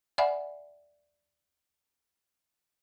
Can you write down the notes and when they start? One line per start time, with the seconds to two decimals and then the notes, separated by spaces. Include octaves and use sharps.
0.18 D5 E5 F#5 G#5 B5